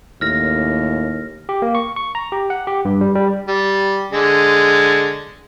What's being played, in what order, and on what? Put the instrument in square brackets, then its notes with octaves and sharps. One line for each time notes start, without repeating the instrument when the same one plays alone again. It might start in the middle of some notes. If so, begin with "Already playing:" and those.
[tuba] D#2 [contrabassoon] A2 [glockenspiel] F6 A#6
[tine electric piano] G4
A#3
C#6
C#6
A#5
G4
F#5
G4
G2
G3
G3
[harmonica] G3
D3 G#3